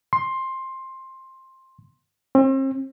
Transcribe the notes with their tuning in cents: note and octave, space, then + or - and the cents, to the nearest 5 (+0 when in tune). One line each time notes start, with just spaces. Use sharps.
C6 +15
C4 +40